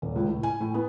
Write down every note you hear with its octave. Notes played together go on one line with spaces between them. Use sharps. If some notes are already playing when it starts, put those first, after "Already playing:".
D#1
C#2
A2
G#5
A2
B3